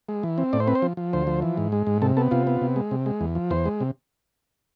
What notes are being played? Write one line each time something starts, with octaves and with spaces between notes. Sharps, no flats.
G#3
E3
C4
A2 D5
C5
C4 B4
C5
F3
F3
D2 C5
F3
E3
G#2
G#3
G#2
C3 A4
B3 A4
C3 F4
B3
C3
G#3
C3
G#3
E2
F3
E2 C5
G#3
C3